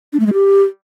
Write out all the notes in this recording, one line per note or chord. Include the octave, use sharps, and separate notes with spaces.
D4
A3
G#3
G4